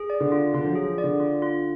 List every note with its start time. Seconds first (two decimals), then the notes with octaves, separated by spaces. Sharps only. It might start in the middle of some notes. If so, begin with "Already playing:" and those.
Already playing: G#4
0.10 D5
0.20 D3
0.32 F4
0.54 D3 F4
0.64 F3
0.71 F#3 G#4
0.86 F3
0.98 D5
1.04 D3
1.20 F4
1.42 F4